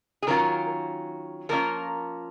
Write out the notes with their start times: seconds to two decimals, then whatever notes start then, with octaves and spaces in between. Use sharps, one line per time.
0.22 G#4
0.27 D#3 F#3 C#4 F4 A#4
1.49 F3 A#3 C#4 F4 A#4